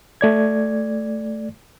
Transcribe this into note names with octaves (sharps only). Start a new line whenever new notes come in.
A3 D5 G#6